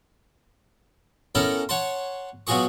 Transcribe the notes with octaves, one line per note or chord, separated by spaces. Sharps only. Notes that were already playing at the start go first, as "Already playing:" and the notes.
B3 C#4 E4 A4 A#4
C#5 F#5 A5 C6
B2 F#3 F4 F#4 G#4 C#6